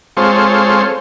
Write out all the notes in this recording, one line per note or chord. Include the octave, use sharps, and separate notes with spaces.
G#3 C4 F4 A4 C5 C#5